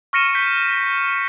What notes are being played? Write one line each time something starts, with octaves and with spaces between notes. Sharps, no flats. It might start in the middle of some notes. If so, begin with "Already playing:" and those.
C#6 F6 A#6 C#7 D#7 E7
G6 B6